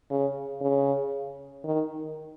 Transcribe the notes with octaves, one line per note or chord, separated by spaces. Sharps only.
C#3
C#3
D#3